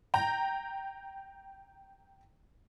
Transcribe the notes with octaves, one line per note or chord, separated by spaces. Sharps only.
G5 A#5